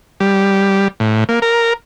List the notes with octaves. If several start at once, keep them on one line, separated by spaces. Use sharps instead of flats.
G3
A2
A#3
A#4